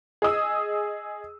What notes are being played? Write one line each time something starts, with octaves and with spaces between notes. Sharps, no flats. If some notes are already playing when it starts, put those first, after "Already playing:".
G#4 D#5 D#6 E6